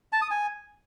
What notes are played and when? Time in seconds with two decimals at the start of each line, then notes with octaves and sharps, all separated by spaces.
0.13 A5
0.22 D#6
0.31 G#5